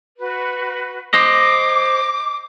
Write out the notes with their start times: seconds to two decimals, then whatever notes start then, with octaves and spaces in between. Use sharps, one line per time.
0.19 F#4 B4
1.14 C5 D#5 D6